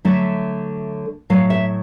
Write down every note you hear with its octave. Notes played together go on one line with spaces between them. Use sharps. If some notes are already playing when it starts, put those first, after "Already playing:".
D3 F#3 A3 E5
A2 F#3 A3 F5
E5